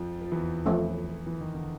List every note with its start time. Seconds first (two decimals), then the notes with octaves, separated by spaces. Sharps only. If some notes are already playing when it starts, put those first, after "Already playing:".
Already playing: F2 F3
0.21 F3
0.31 E2 E3
0.66 F3 A3 C#4
1.26 E3
1.41 D#3
1.54 D3